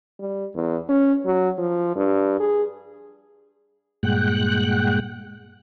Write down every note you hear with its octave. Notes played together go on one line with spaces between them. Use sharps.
G3
E2
C#4
F#3
F3
G2
G#4
G2 A#2 G#3 F#5 G5 F#6